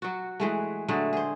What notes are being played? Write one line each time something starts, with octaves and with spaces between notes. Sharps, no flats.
F#3 F#4
E3 G#3 A3
D3 F#3 G#3 A3
G#4 C5